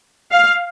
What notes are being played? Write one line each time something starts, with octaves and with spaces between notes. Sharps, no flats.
F5